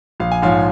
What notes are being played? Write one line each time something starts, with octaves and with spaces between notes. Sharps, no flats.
A#1 F5
G#5
G#2 F3 C#5 F5